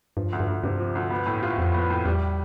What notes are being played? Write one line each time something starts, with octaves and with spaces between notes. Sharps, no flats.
G2 F3
D2
G2
D2
G2 C3
F3
D2
B3
A2
F4
F2 F3
B3
A2
E2 G3